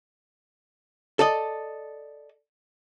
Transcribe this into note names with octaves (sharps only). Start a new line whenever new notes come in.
A4 D5 D#5